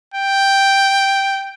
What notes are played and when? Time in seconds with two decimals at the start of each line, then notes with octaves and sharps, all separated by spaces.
0.14 G5